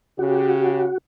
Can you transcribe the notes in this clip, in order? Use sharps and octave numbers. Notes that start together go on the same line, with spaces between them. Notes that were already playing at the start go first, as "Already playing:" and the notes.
C#3 F#4 G4